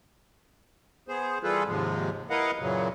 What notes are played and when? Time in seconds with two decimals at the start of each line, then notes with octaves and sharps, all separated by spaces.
1.08 B3 G#4 C5
1.43 E3 G3 F4 G#4 A4 B4
1.67 D#2 G#2 C3 F3 G#3
2.30 E4 A#4 B4 D#5 F5 F#5
2.60 F#2 A#2 C#3 E3 F#3